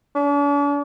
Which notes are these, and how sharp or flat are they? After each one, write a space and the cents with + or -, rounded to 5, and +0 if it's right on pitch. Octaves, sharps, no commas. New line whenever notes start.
D4 -45